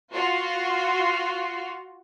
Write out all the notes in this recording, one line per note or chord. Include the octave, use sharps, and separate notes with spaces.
F4 F#4